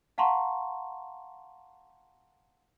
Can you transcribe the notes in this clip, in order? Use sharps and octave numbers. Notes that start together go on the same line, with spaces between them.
F5 F#5 A5 A#5 C6 C#6